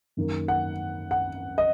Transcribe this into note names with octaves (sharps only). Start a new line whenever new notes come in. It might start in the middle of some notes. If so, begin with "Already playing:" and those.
F#2 D#3 A#3
F#5
F#5
D#5